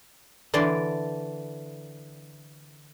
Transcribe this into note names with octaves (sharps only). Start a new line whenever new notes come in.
D3 E3 D5 C6